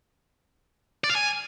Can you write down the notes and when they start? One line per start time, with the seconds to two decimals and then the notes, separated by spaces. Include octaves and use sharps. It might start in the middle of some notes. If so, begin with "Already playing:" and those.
1.04 D5
1.10 F5
1.15 G#5